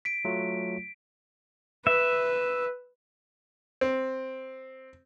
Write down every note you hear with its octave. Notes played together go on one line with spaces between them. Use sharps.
B6 D7
F#3 A3 F4
B4 E5
C4